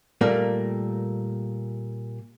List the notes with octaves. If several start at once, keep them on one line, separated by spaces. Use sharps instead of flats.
A#2 G3 A3 A#3